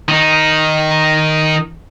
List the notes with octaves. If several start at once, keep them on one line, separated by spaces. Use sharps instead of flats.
D#3 D#4